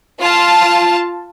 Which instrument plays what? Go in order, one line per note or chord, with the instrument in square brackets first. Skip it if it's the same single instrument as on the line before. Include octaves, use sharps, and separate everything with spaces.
[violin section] F4 A5